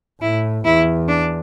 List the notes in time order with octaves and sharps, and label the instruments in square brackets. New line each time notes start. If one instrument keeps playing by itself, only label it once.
[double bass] A2 [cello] E4
[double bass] E2 [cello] E4
[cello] D4